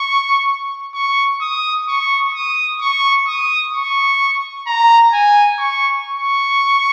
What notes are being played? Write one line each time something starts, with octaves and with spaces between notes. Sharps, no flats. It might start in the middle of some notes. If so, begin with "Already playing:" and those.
Already playing: C#6
C#6
D#6
C#6
D#6
C#6
D#6
C#6
A#5
G#5
C#6
C#6